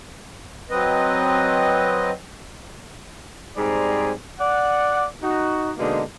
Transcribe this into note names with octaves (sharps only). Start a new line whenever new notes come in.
F#3 C4 B4 D#5
G#2 G3 C4 D5 G#5 A#5
D5 F#5
D#4 F#4
B2 D3 G#3 A#3 D#4